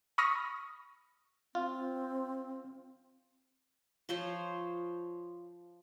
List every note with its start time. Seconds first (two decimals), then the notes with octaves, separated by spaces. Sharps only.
0.18 B5 C#6 D#6 F6 A#6
1.55 C4 F4
4.09 F3 F4 C5 C#5